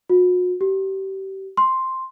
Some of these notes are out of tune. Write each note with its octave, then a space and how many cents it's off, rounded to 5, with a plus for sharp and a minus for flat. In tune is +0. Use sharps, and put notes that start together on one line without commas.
F#4 -40
G4 -30
C6 +0